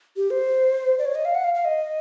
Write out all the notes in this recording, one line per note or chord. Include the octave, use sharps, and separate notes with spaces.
G4
C5
D5
C#5
D#5
F5
F#5
F5
F5
D#5